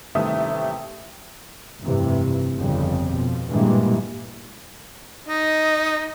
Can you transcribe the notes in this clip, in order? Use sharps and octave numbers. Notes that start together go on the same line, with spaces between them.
A1 D#2 C3 G3 A3 D#6
F1 G2 C3 E3
G1 F2 C#3 F3 G3
B2 F3
G2 A#2 E3 G3 G#3 A#3
D#4 D#5